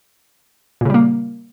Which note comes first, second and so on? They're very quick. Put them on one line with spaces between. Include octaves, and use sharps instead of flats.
A#2 C#3 G3 A#3